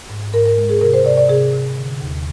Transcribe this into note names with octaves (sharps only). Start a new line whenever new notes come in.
G#2
G#2 A#4
A#4
G#3
G#4
C3 A#4
C5
C3 D5
D5
C3 G#4
C3
D3
D#2